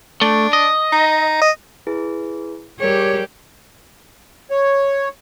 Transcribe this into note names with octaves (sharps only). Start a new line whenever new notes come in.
A3 D4
D#5
D#4
D#5
E4 G#4 B4
G3 G4 G#4 A#4 C#5
C#5